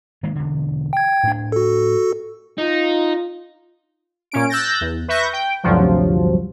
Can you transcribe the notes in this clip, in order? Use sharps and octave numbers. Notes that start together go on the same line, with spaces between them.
D#3 G#3 A#3
E1 D3
G5 G#6
A2 D4
F#4 A4
D#4 F4
A#2 C#4 D7
E6 F#6 G6 A6 A#6
E2
B4 E5 C#6 G6 A#6
G5
A1 D2 G2 C3 F3 F#3